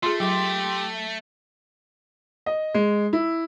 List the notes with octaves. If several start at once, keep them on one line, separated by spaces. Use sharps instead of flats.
A3 F4 G#4 C6
F#3 G4 D6
D#5
G#3
E4